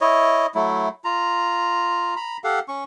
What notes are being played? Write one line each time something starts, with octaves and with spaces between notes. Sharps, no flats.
E4 C#5 D#5
F#3 A3 E4
F4 A#5
A#5 B5
G4 A4 F5 F#5
C#4 C#6